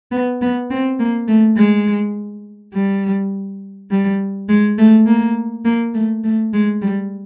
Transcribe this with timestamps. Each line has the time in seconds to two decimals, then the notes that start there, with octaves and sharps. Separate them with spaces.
0.12 B3
0.41 B3
0.70 C4
0.99 A#3
1.28 A3
1.57 G#3
2.74 G3
3.91 G3
4.49 G#3
4.78 A3
5.06 A#3
5.65 A#3
5.94 A3
6.24 A3
6.53 G#3
6.81 G3